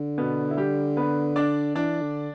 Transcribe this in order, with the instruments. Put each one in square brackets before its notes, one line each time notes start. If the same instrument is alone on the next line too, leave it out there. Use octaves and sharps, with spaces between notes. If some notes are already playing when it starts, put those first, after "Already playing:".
Already playing: [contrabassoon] D3
[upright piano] B2 B3
E4
G3 G4
B3 B4
D4 D5
[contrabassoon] E3 [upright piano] D4 D5
[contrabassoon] D3